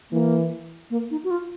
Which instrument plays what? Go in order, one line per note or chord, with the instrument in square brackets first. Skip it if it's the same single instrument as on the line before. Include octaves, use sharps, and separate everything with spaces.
[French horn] E3 [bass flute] A#3
[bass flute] A#3
D#4
F#4
F4